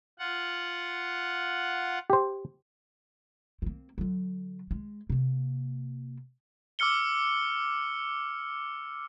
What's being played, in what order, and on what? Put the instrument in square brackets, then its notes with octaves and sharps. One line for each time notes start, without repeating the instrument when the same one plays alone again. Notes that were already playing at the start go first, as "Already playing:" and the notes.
[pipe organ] F4 F#5
[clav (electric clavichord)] G4 C5
[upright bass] A#3 C4
D3 F#3
G#3
C3 A#3
[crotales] D6 E6 F6 C#7 G7